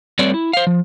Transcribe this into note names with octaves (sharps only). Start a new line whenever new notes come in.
G3 A3 C4 B4 C#5 D5
E4
C5 F5
F3